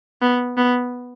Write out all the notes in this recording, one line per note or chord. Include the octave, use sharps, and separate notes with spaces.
B3
B3